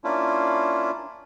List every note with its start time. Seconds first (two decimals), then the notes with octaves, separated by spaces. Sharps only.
0.04 A#3 C#4 D4 E4 F4